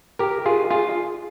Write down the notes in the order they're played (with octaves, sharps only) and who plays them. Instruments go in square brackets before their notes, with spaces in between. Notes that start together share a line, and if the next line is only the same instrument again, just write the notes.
[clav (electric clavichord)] G4 A#4
F4 G#4
F4 G#4